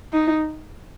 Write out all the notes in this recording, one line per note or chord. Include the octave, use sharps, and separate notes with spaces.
D#4